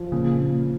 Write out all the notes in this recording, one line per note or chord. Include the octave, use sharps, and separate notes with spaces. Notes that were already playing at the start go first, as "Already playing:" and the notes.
Already playing: F3
A#2 C#3
A#2